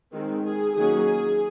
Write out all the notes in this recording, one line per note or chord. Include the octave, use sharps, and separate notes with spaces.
D#3 G#3 C4
G#4
D#3 F#3 A#3 C#4 G#4